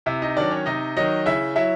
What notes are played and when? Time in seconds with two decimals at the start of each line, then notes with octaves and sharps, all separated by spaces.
0.06 C3 E4 E5
0.22 D#4 D#5
0.37 D#3 F#3 D4 D5
0.51 C#4 C#5
0.66 C3 D#4 D#5
0.97 D#3 F#3 D#4 D#5
1.26 C#3 E4 E5
1.56 F#3 E4 E5